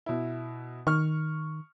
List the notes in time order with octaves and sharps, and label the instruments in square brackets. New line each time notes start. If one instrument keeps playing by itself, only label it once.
[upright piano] B2 E4
[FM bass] D#3 [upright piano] C#6 F6